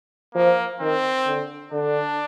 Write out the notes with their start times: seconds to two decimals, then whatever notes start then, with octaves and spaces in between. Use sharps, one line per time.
0.35 F3 A#3
0.80 D#3 C4
1.27 D3
1.71 D3 D4